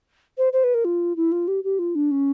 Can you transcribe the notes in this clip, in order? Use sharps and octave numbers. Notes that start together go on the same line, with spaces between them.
C5
C5
B4
A#4
F4
E4
F4
G4
G4
F4
D4
C#4